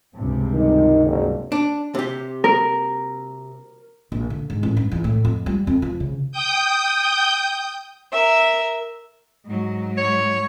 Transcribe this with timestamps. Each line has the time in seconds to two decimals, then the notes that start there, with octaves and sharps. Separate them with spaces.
0.15 C#2 G2 C3
0.54 D#3
1.06 F#1
1.52 D4
1.95 C3 G4
2.44 A#4
4.12 A#1
4.30 D3
4.50 G#2
4.63 A1
4.77 G2
4.92 E2
5.04 A2
5.25 F2
5.46 G3
5.67 F2
5.82 F3
6.00 C#3
6.31 G5 D#6 G6
8.12 A#4 E5
9.46 G#2 F#3
9.98 C#5